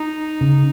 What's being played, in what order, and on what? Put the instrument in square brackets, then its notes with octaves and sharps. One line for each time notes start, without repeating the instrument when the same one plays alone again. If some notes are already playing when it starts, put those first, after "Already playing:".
Already playing: [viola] D#4
[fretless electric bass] C#3